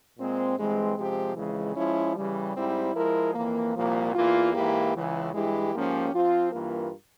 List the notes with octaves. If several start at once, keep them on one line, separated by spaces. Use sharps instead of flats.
A#2 G#3 C4
G2 E3 G#3 C4
C3 F3 G#3 C4 G4
F2 C#3 E3 G#3
F3 G#3 C#4 E4
C#3 E3 G3
G#2 G3 C4 E4 G4
F3 G#3 E4 A#4
F2 E3 A#3
C2 A#2 F3 A#3
E2 E3 A#3 F4
G#2 E3 A#3 E4 G4
C#2 C#3 E3
G2 E3 G#3 E4 G4
G#2 F3 A#3 C#4 G4
F3 C4 F4
G2 E3 A#3 F4 A#4